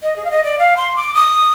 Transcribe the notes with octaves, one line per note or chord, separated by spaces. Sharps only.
D#5
G#4
F5
D#5
D5
F5
C6
D6
D#6